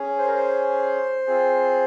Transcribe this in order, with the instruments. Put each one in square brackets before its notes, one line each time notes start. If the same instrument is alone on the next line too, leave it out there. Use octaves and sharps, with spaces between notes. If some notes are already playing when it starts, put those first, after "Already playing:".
Already playing: [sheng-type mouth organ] C#4 G#4
C5
A#4
C5
C4 F4 G#4